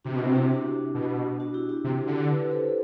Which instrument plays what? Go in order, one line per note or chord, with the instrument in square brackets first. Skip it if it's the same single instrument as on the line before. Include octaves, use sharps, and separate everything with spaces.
[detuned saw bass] C3 [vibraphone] D4 F#4
[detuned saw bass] B2 [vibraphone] E4
[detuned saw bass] C3
[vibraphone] E4 G4
D4 F#4
[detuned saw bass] B2
[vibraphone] D4 F#4
E4 G4
E4 G4
[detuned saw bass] C3
D3
[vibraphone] G4 B4
A4 C5